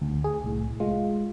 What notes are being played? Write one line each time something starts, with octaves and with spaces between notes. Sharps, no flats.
D2
G#4
C2 A2
G#3 F4